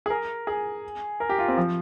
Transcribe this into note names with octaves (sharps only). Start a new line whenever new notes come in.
G#4
A#4
G#4
A#4
G4
F4
C4
F3